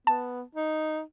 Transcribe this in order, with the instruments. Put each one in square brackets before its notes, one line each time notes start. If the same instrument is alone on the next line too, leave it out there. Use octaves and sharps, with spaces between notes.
[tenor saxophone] B3 [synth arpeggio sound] A5
[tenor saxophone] D#4